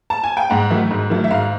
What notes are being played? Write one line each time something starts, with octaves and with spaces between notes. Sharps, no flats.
A5
G#5
G5
G#2 F#5
D#3 F#3 A3
G#2
D#3 F#3 A3
E5
G#2 F5